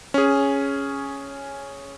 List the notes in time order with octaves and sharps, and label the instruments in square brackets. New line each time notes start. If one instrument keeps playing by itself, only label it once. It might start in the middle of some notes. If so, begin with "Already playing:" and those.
[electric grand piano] C#4 G#4